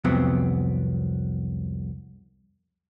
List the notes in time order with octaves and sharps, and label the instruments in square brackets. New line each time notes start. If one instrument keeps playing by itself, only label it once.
[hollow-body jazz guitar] C2 F2 F#3 B3 C4